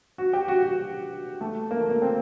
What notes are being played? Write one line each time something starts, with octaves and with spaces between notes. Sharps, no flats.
F#4
G4
F#4
F#4
A3
A#3
A3
A#3
C4